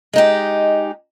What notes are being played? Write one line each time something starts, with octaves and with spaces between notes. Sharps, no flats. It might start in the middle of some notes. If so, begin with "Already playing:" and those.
G#3 D#4 G4